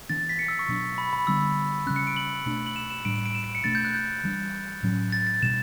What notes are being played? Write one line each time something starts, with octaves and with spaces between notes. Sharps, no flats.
E3 B3 D4 A6
B6
C#7
E6
C#6
B2 F#3 B3 D4
B5
B5
D3 G3 B3 D4 E6
C#3 G3 C#4 F#6
C#7
D7
F#7
B2 A3 D4
F#7
E7
E7
A2 G3 D4 D7
E7
D7
E7
D7
C#7
B2 A3 D4 A6
G6
F#6
G6
E3 G3 D4
A2 F#3 C#4
A6
A6
B2 G3 D4 E7